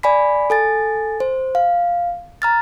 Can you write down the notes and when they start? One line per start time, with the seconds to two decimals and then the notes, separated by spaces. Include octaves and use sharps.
0.03 D5 G#5 B5 B6
0.50 A4 G#5 A6
1.20 C5
1.55 F5
2.42 A#5 F6 A6